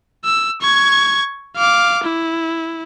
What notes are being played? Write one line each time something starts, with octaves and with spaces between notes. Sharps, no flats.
E6
C#6 G#6
F5 D6
E4